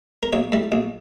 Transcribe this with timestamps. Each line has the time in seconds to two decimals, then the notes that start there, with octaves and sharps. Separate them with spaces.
0.23 A#4
0.33 A#1 C#5
0.52 A2 G3
0.72 A#1